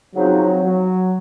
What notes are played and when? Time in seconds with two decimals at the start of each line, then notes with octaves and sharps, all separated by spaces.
0.14 C#3 F3 F#3 C4 D#4
0.62 F#3